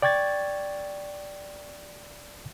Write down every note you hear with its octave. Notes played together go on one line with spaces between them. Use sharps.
D5 G5 C#6 G#6 A6